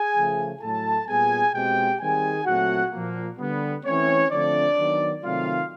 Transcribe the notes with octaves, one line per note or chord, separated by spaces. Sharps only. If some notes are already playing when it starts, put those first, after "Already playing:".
Already playing: G#4 G#5
C#3 F3 A3
A2 F#3 A3 A4 A5
A#2 G3 B3 G#4 G#5
B2 G#3 C4 G4 G5
D#3 G3 C4 G#4 G#5
A#2 F#3 A3 C4 F#4 F#5
A#2 F3 A#3
D3 G3 B3
E3 A3 C4 C#4 C#5
D3 F3 A3 C4 D4 D5
D#3 F#3 B3
C3 D#3 F#3 A3 C4 F4 F5